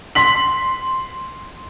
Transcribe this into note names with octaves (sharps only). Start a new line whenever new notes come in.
C6 B6 F#7